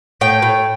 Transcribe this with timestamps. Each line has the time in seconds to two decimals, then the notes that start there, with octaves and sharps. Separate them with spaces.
0.21 A2 G5
0.42 A2